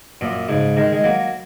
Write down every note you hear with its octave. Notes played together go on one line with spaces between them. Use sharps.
F#2 A#2
G#2 C#3
D#3 G#3
G#3
F#3 A#3